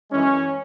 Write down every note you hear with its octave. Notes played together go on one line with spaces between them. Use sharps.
F#2 E3 G#3 C#4